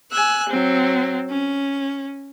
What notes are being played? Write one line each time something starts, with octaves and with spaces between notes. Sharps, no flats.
G#5 E6 F#6
F#3 C4
C#4